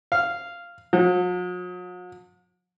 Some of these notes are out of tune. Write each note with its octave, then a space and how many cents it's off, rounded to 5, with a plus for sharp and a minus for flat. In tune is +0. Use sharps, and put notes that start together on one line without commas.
F5 -10
F#3 -45